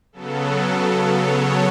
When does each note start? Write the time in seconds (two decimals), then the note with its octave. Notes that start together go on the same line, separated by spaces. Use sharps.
0.13 C#3 F#3 B3 A4
0.46 A4
0.80 C#3 F#3 B3
1.13 C#5